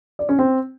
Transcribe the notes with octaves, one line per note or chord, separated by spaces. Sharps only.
D5
C#4
C4